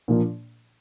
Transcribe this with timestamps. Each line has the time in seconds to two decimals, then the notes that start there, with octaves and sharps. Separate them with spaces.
0.08 A#2 F3 A#3 D4